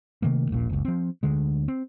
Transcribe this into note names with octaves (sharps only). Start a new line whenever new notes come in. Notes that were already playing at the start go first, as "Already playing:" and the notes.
C3 D#3 A3 A#3
D#1 A#1 A#2
F#1 C#2
F3 C4
D2 D3 G#3
C4